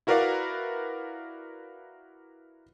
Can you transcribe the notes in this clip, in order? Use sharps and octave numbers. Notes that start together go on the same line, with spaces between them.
E4 F#4 A#4 B4 D5 F5